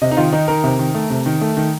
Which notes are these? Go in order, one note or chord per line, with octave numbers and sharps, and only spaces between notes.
C3 D#5
D#4
D#3 F4
D#3 D#4
D#3 A#4
C3
D#3
A3
C3
D#3
A3
D#3